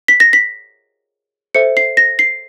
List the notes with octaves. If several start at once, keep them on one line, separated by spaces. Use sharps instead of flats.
B6
A#6
B6
A4 C5 E5 C#7
C7
A#6
C7